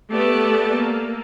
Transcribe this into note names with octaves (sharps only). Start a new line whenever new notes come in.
A3 B3 G4 A4 D5 A5
A#3